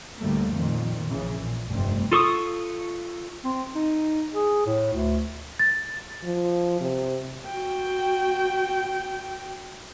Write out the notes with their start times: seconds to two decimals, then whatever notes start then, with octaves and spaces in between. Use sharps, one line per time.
0.18 D2 A2 G3 A3 A#3
0.52 F2 A#2 D#3
1.07 A#1 C#3 E3
1.41 A#2
1.70 F1 G2 G3 A3 C4
2.11 F4 A4 C#6 D#6
3.44 C4
3.75 D#4
4.34 G#4
4.66 A2
4.93 D2
5.59 A6
6.24 F3
6.81 C3
7.46 F#4 G5